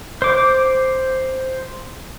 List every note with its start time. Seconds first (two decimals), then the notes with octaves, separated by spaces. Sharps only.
0.22 C5 D6